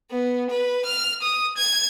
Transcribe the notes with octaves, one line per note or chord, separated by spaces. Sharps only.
B3
B4
F6
D#6
G#6